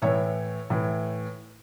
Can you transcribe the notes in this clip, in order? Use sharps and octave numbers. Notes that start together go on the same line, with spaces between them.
A2 E3 C#5 E5
A2 E3